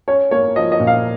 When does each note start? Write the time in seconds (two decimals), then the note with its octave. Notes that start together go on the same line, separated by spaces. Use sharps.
0.08 C#4 C#5
0.31 A#3 C#5
0.56 F3 D#5
0.72 D#5
0.80 A#2
0.87 F5